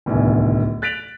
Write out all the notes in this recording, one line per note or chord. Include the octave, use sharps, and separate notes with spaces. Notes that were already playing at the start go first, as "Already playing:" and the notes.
D1 C2 D#3 B3 G#5
F#6 A6 B6 D7 F7 F#7